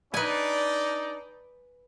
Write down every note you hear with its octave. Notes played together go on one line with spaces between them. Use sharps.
D4 D#4 B4 D5 G#5